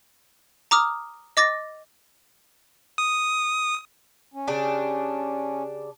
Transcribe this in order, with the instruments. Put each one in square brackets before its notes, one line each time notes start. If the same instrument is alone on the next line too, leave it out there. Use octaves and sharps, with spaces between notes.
[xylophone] A#5 D6 D#6 F6
D#5 D6 A6 A#6
[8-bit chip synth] D#6
[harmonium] C#4
[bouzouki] C#3 D4 G4